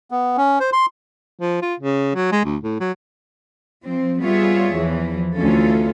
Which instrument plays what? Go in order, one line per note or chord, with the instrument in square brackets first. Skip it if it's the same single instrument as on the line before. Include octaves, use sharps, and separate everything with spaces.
[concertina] B3
C#4
C5
C6
[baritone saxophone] F3
F4
C#3
F#3
G#3
D2
A2
F#3
[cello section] F3 C4
G3 B3 F4 G#4 C#5 E5
E2 E3 F3
D2 E3 C#4 F4 A4